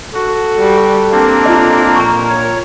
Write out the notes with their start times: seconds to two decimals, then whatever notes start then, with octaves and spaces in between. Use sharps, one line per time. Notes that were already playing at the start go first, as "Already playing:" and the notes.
0.14 F#4 A4
0.59 G3
1.11 A#3 C4 D4 A#4
1.45 F4 D#5
1.95 A#2 A#5 C#6
2.29 C#5